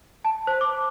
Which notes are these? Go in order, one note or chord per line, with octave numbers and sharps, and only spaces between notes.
A5
C5
D6